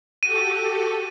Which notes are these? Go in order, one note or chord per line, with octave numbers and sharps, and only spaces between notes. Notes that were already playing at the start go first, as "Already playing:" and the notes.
F#4 G4 A4 D#7